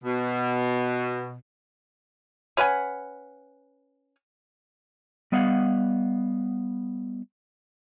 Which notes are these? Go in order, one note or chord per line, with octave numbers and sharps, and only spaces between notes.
B2
C#4 B4 F#5 G#5
G3 B3 D#5 F5 F#5